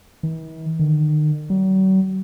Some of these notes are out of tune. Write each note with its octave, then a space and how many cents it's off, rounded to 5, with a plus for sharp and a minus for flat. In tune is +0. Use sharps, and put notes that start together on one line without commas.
E3 -45
D#3 -40
F#3 +45